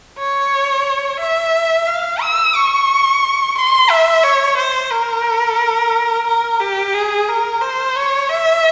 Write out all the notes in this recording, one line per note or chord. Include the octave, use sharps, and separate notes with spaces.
C#5
E5
F5
E6
C#6
C6
E5
C#5
C5
A#4
A#4
G4
G#4
A#4
C5
C#5
E5